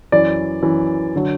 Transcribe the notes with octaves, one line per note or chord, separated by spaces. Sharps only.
F#2 E3 D5
F#2 E3
D3 F#3